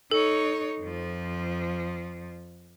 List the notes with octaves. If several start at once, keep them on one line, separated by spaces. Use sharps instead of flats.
D#4 A4 C#5
F2 F3